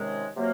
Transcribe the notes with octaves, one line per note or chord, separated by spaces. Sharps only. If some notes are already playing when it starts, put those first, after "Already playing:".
Already playing: C3 D#3 G#3 C#4
C3 F#3 A#3